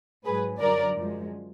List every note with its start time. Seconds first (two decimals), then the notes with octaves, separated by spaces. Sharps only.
0.25 G#2 F#3 G#4 B4
0.60 F#2 D3 F#3 A#4 D5
0.96 F#2 F3 G#3